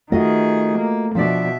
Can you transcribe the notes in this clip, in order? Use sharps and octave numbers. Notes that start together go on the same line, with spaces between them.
D#3 A3 F4 F#4 G#4 D#5
A#3
B2 F3 D4 D5 E5